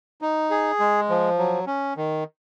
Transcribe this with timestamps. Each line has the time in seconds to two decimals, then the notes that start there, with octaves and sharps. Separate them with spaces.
0.22 D#4
0.51 G#4
0.80 G#3
1.10 F3
1.38 F#3
1.67 C#4
1.97 D#3